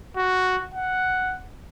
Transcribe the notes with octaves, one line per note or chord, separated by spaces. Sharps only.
F#4
F#5